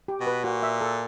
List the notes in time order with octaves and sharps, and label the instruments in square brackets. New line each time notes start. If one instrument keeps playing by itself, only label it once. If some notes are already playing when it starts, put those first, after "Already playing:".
[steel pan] G4
[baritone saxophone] B2
[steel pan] B4
[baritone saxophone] A#2 [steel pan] F#4
[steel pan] E5
A4